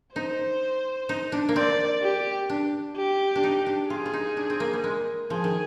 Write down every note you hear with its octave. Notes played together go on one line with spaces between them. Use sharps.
D#4 C5
D#4
D4
A#3
C4 D5
G4
D4
G4
D4
D#4
D4
F4 G#4
F4
D#4
D4
C4
A#3
G3
G#3
F3 G#4
D#3